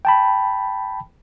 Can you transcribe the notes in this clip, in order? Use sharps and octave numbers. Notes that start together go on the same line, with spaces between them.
G5 A5 B5